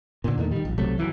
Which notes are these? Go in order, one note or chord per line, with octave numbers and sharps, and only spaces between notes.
A#2 D3
E2 A#2 D#3 A3
D#3 G3
A#1
B1 C3 F#3 A3
G1 C#2 E3 F#3